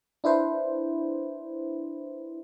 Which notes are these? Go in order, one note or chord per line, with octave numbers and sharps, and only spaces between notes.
D4 E4 B4 C5